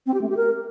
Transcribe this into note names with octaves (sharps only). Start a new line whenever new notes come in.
C4
G4
A3
G4
A#4